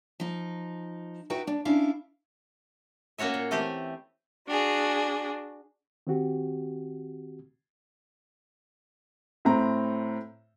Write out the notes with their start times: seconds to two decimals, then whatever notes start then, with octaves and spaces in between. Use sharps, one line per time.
0.20 F3 D#4
1.30 D#4 E4 F#4 B4 G5
1.47 D4
1.65 C#4 D4 E4 F5
3.18 A#3 C#4 F#4 C#5 E5
3.34 A#2
3.51 E3 A3 C4 G4
4.47 D4 F#4 G#4
6.07 D#3 C4 F#4 G4
9.45 A2 C4 A#5